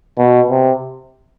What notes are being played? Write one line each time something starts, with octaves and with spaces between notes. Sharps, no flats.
B2
C3